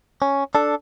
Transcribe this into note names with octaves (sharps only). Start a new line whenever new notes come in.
C#4
D4 A4